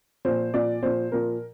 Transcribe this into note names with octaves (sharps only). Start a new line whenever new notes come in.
A#2 F3 C5
A#2 F3 D5
A#2 F3 C5
A#2 F3 A#4